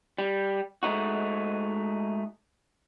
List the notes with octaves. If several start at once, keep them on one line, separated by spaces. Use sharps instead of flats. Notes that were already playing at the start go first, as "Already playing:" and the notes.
G3
G#3 A3 D#4 F#4